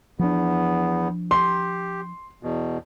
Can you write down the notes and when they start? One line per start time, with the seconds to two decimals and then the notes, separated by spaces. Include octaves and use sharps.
0.19 E2 F3 B3 D4
1.31 G4 C6
2.43 E2 B2